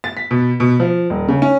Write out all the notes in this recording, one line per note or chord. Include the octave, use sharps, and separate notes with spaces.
A6
B6
B2
B2
F3
D#1
C#3
C#4